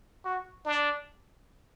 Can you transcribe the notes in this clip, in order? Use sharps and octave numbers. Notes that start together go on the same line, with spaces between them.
F#4
D4